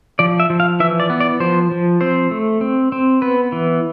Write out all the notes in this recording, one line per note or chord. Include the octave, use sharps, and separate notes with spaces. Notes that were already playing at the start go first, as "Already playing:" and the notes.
F3 D5
E5
F3
F5
E3 E5
D5
B3
D5
F3 C5
F3
C4 C5
A3
C4
C4
B3 B4
E3